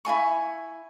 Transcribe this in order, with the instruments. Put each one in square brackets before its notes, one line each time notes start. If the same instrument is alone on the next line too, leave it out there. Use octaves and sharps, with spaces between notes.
[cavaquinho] E4 F4 G#5 C#6